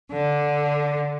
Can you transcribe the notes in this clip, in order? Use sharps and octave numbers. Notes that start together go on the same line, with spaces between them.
D3